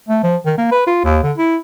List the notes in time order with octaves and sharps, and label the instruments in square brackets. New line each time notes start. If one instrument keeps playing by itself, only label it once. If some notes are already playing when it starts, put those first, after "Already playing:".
[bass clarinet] A3
F3
D#3
A#3
B4
F4
D#2
D3
E4